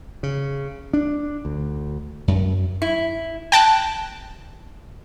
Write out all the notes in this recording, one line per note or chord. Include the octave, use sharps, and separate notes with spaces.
C#3
D4
D2
F#2
E4
G5 A5 F#6